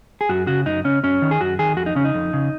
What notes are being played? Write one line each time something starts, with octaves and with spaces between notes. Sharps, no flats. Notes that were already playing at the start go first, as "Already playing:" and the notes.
G#4
F#2 F#4
C#3 F#4
F#2 D#4
C#3 C#4
F#2 C#4
D#3
G#4
F#2 F#4
D#3 G#4
F2 F#4
D#4
C#3 C#4
D#4
F2
C#3